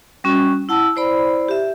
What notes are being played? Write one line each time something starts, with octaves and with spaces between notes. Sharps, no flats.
G3 C#4 F#4
E4 F#5 A5 E6
E4 C5 D5 B5
G4 E5